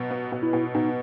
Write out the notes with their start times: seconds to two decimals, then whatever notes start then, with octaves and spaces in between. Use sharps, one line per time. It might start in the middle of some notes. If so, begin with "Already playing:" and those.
Already playing: B2 F#3 B3
0.11 B3
0.32 B2
0.43 E4
0.53 B2
0.75 B2 D#4